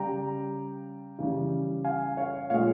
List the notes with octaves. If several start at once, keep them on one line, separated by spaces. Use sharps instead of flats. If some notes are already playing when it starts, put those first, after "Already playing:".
Already playing: C#3 G3 G5 A#5
C#3 E3 G3
F5 G#5
C#5 F5
A#2 F3 G#3 C#5 F5